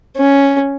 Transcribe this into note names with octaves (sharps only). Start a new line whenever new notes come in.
C#4